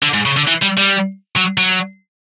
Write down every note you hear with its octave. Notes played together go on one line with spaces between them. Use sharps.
D3
G#2
C#3
D3
E3
G3
G3
F#3
F#3